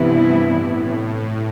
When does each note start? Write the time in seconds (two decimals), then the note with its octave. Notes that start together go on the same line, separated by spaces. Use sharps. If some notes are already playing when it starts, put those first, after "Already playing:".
Already playing: G2 C3 E3 B3 E4
0.33 A2